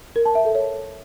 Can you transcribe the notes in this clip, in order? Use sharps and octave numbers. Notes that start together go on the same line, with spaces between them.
A#4
A5
E5
A4
C#5